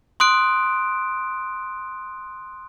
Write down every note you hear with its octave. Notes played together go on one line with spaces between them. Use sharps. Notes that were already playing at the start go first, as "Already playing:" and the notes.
C6 D#6 F#6 D7